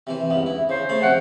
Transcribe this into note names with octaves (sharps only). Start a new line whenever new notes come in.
C3 E3 C5
C#2 G2 B3
E4
C#3 C5
C#3 A3 A5
C3 F3 F#5